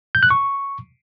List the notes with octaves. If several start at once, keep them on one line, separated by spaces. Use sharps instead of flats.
G6
F#6
C#6